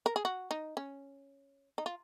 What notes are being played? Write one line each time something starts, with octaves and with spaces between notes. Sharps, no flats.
A#4
G#4
F#4
D#4
C#4
D#4
F4